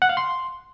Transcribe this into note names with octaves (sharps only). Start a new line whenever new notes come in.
F#5
F5
C6